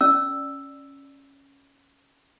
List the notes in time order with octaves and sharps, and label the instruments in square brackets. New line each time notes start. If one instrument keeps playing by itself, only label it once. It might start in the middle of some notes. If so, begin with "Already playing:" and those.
[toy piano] C#4 D5 E6